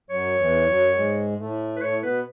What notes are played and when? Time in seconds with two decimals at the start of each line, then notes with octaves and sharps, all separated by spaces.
0.10 F#2 F#3 C#5
0.39 E2 E3
0.67 F#2 F#3
0.86 F#3
0.95 G#2 G#3
1.39 A2 A3
1.76 B4
1.81 A2 A3 C#5
2.03 B2 B3 B4